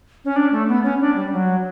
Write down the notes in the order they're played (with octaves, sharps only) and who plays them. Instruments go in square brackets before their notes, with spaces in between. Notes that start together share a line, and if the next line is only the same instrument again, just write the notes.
[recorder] C#4
D4
A3
B3
C#4
D4
G3
F#3